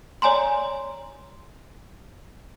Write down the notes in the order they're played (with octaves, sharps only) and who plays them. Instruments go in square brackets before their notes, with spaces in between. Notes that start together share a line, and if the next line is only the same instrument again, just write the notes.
[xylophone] C#5 D5 G#5 A#5 C6